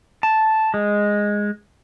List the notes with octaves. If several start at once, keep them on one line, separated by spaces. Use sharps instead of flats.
A5
G#3